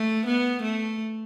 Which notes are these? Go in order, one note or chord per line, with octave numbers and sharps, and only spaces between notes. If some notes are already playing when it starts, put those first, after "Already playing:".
Already playing: A3
B3
A3